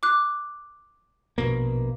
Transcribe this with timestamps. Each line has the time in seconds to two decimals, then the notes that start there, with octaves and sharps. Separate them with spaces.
0.03 D6 F#6
1.38 A#1 B2 A#3